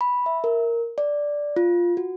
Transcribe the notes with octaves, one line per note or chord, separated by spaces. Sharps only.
B5
E5
A#4
D5
F4
F#4